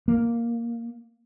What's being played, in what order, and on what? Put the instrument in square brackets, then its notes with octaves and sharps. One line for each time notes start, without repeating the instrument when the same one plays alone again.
[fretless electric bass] A#3